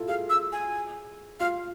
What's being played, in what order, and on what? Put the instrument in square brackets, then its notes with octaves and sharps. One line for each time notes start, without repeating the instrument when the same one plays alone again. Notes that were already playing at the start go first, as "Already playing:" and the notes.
Already playing: [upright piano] E4 F4 A4
[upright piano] G#4 [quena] F5
[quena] E6
G#5
[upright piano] F4 [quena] F5